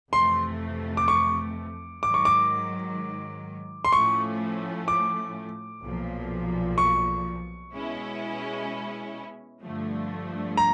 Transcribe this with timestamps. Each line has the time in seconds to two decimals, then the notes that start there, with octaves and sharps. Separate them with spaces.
0.13 F2 C3 E3 A3 C6
0.97 D6
1.08 C#6
2.03 G#2 D#3 F#3 D6
2.14 C#6
2.25 D6
3.85 C6
3.93 A2 F3 A3 C#4 C#6
4.88 D6
5.83 B1 A#2 F3
6.78 C#6
7.73 B2 G#3 C#4 E4
9.62 G2 D3 F3 A3
10.57 A#5